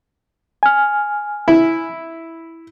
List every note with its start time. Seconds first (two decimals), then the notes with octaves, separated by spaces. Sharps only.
0.63 G#5 F6
1.48 E4